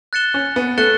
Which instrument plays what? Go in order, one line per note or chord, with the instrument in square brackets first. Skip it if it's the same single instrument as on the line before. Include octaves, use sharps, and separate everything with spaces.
[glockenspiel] F#6 A6 C#7 E7 G7
[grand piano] C#4
B3
[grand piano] A3 [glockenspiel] F#6 A6 C#7 E7 G7